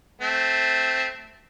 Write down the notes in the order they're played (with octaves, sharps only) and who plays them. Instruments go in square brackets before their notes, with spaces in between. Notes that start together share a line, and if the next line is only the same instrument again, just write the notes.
[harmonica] A3 C4